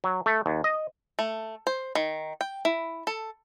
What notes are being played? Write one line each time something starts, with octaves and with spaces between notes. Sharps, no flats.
F#3
A3
D#2
D#5
A3
C5
D#3
G5
E4
A4